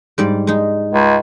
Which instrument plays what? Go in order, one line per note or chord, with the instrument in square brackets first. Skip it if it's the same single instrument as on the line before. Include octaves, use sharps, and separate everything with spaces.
[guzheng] G#2 G3 D5
G#3 D#4
[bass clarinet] C#2